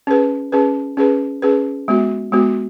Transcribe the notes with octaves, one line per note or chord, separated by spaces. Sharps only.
C#4 G#4 B4
C#4 G#4 B4
C#4 G#4 B4
C#4 G#4 B4
G#3 B3 F#4
G#3 B3 F#4